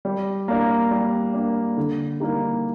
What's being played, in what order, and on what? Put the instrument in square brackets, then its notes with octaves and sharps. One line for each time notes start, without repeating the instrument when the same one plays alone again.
[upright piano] G3
A#3 D4
G3
A#3 D4
D3
G3 A#3 D#4 G4